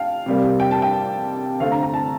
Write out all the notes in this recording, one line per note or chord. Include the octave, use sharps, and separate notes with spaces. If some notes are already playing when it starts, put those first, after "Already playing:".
Already playing: F5 G5 A5
C3 G3 A#3
G5
A5
G5
D3 A3 C4 F5
A#5
A#5
A5